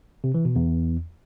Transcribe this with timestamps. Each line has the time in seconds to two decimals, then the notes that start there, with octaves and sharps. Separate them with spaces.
0.24 C3
0.34 E3
0.45 B2
0.56 E2